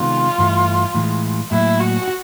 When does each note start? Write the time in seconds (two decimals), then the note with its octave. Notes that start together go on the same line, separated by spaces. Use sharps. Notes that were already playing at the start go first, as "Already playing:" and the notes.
Already playing: C3 D#3 G#3 B3 F4
0.38 G2 E3 A3
0.94 A2 E3 G#3
1.51 A2 F#3 A#3 E4
1.80 F#4
2.08 F#4